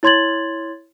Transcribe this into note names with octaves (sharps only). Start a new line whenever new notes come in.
E4 C#5 C6 G#6 A6 F#7